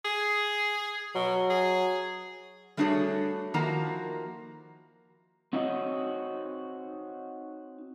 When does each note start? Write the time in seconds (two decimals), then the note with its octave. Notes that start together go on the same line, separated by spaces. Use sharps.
0.05 G#4
1.15 B2 F#3
1.50 G#4
2.77 G3 A3 D4 F#4 G#4 C#5
3.54 D#3 F3 A#3 E4 F#4 A#5
5.53 C4 D#4 F#4 C#5 D#5